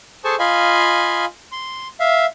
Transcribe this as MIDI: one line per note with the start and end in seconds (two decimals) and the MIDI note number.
0.24 0.35 68
0.24 0.35 69
0.24 0.35 72
0.24 0.35 80
0.24 0.35 81
0.24 0.35 85
0.39 1.25 65
0.39 1.25 75
0.39 1.25 77
0.39 1.25 80
0.39 1.25 83
1.52 1.88 84
2.00 2.26 76
2.00 2.26 77